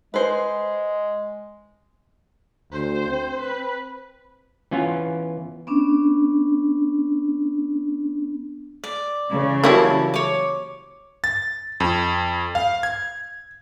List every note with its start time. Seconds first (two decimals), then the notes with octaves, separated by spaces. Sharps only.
0.14 G#3 B4 C5
2.72 D2 C5
3.09 C4
3.40 B4
4.71 E3 B3 C#4 F4
5.67 B3 C#4 D4
8.84 D5
9.31 C#3 E3
9.64 F#3 G3 A#3 E4 A5
10.14 C#5 D6
11.24 A6
11.80 F2
12.55 F5
12.83 G#6